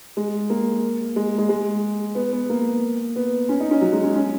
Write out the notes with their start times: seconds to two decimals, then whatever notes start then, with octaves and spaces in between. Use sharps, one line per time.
0.17 G#3
0.50 A#3
1.16 G#3
1.38 G#3
1.49 G#3
2.15 B3
2.32 B3
2.49 A#3
3.16 B3
3.49 C#4
3.60 D#4
3.71 C#4
3.81 F#3
3.92 G#3
4.04 C#4
4.15 C#4